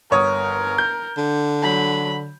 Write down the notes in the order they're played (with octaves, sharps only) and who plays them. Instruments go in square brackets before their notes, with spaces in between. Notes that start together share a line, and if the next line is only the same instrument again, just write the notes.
[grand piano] G1 C#5 D#6 [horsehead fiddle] A#4
[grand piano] G6
[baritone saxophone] D3
[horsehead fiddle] F#3 B5